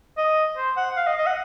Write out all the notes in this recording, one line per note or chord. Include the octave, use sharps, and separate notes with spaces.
D#5
C5
F#5
F5
D#5
D#5
F#5